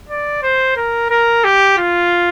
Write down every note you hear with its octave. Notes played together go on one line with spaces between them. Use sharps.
D5
C5
A#4
A#4
G4
F4